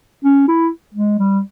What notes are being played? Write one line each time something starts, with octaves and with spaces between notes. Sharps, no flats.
C#4
E4
G#3
G3